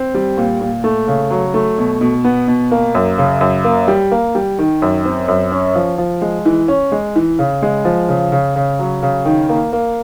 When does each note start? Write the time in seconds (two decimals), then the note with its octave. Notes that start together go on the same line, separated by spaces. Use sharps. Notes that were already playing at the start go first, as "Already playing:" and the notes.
Already playing: C4
0.15 G3
0.38 A#2
0.61 A#2
0.84 A3
1.08 C#3
1.30 F#3
1.54 A3
1.78 B2
2.01 B2
2.24 B3
2.48 B2
2.71 A#3
2.95 F#2
3.18 C#3
3.41 F#2
3.64 A#3
3.88 G3
4.12 A#3
4.35 G3
4.59 D#3
4.82 F#2
5.05 C4
5.28 F#2
5.52 C#4
5.75 F3
5.98 F3
6.22 G#3
6.45 E3
6.68 C#4
6.92 G#3
7.16 E3
7.39 C#3
7.62 G#3
7.85 F3
8.09 C#3
8.32 C#3
8.56 C#3
8.79 F#3
9.02 C#3
9.25 D#3
9.49 A#3
9.73 A#3